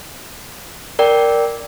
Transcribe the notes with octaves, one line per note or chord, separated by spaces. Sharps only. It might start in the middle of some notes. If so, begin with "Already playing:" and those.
A#4 D5 G5